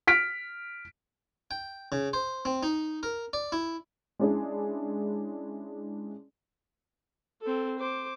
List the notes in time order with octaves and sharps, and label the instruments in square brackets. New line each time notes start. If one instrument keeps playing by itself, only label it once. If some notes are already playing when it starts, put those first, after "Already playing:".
[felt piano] F6 B6 D7
[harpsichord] G5
C#3
C5
C4
D#4
A#4
D5
E4
[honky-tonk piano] G#3 C#4 D4 E4 G#4
[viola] C4 A4
C5 D6